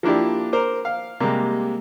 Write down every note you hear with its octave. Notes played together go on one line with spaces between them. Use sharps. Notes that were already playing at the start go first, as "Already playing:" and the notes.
F3 A#3 D4 E4 G4
A#4 C5 D6
F5
C3 G3 G#3 A#3